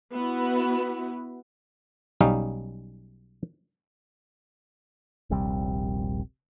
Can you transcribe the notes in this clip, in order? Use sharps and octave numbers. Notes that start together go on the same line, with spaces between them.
B3 E4 F#4
B1 G3 C#4 D#4 F5
D#1 A#1 C3 G3